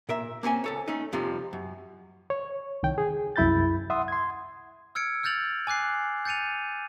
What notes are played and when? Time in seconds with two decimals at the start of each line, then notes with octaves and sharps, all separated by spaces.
0.09 A#2 A#4 E5
0.43 A#3 C4 C#4 G#5
0.64 C#2 A4 C#5
0.88 A3 C#4 D#4
1.13 F2 C3 F3 G3
1.53 F#2
2.30 C#5
2.83 C2 D#3 G5
2.98 G#4
3.36 C2 F#2 E4 B5 G6 A6
3.90 E5 F#5 C6 D#6
4.08 C6 G#6
4.95 E6 F6 G#6 C#7 D7
5.23 E6 F6 G6 A6 F7 F#7
5.67 G#5 D6 F#6 C7
6.25 G6 A6 C#7 D#7 F7